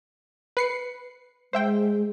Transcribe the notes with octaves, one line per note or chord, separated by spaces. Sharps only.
B4 C7 C#7
G#3 C5 E5 G5